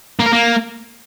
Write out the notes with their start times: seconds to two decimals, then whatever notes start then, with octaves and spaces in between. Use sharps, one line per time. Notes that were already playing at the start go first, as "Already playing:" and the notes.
0.19 A#3
0.26 A#4
0.32 A#3